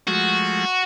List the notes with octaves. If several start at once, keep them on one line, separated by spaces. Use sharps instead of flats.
F3 G#3 A3 F#4